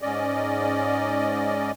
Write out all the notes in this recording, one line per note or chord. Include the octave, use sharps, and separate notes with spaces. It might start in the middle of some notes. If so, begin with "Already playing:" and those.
G#2 C#4 D5 D#5